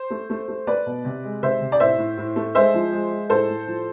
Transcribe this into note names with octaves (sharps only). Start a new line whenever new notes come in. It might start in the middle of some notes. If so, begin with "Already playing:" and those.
Already playing: C5
A3
A3
A3
A3 B4 D5
B2
C3
G#3
C3 C5 E5
C3
D5
A2 C5 E5
A2
A2
A3
G#3 C5 E5
F3
G#3
G#3
A2 A4 C5
A2
F3